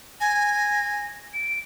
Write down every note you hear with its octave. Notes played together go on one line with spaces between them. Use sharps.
G#5 A#6
D7